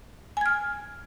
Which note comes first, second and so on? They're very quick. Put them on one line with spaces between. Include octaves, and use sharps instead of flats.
G#5 G#6 F6